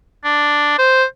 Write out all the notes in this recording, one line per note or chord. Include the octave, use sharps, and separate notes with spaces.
D4
C5